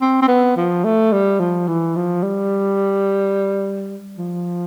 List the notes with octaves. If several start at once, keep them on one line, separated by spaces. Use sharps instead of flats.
C4
C4
B3
F3
A3
G3
F3
E3
F3
G3
F3